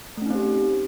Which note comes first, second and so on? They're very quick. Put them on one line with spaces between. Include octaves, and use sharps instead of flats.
A3 C#4 D#4 C4 G4